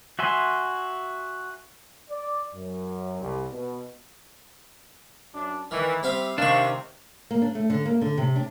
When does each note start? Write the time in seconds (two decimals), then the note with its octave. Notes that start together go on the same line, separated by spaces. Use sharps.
0.19 F#4 E5 G#5 C6
2.10 D5
2.54 F#2
3.21 C2
3.51 B2
5.33 F#2 D4
5.71 D#3 E3
6.03 G3 C4 E5 F5
6.38 C3 D#3 D4 F5 C#6
7.31 A#3
7.42 D4
7.55 A3
7.70 D3
7.86 A#3
8.01 D3
8.18 C3
8.36 D4